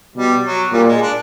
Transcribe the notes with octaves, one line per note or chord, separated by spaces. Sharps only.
B2 G3
F#3
A#2 G3
G#3
D4